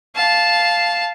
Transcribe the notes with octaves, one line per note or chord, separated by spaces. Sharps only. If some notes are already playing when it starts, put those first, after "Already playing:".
F5 A5